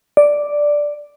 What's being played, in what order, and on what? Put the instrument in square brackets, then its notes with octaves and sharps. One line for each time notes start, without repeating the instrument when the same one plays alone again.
[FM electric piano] D5